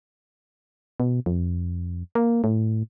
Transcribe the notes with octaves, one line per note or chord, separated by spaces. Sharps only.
B2
F2
A#3
A2